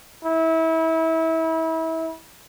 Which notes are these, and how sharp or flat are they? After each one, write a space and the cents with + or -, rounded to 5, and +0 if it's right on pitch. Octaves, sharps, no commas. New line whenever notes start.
E4 -30